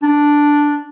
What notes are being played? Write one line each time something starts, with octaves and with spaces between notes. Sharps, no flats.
D4